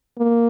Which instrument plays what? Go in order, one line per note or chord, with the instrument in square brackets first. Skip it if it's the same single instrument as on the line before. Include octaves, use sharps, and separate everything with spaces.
[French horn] A#3